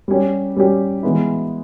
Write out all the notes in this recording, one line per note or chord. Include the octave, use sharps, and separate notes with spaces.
G3 C#4 G4
G3 C#4 G4
E3 G#3 B3 E4